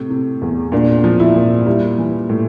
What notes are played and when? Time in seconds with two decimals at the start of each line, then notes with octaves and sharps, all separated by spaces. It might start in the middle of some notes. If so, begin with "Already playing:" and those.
Already playing: A2 C3
0.10 C3
0.41 E2
0.72 A#2 D4
1.04 F3
1.20 E4
1.35 A#2
1.66 G3 E4
1.98 E3
2.29 A2